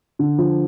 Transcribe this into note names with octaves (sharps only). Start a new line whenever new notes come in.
D3
F3